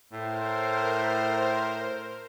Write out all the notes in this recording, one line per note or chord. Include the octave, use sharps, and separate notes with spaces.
A2 A#4 C5